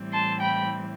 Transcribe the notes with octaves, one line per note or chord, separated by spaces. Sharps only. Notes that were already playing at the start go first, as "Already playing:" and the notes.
Already playing: A2 E3 G3 C4
A5 C6
G5 B5